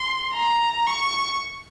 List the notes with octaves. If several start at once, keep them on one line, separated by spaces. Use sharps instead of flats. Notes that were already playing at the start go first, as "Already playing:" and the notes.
Already playing: C6
A#5
C#6